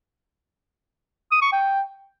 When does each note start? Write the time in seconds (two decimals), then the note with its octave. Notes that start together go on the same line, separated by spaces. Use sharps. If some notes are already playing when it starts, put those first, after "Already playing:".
1.32 D#6
1.42 C#6
1.52 G5